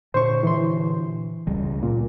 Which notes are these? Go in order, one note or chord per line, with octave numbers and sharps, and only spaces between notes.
A#2 D3 D4 C5 C#6
E3 C6
C#2 C#3 G3
A#2